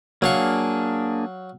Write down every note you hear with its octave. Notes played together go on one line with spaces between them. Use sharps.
F#3 A#3 D4 G#4 F5 C#6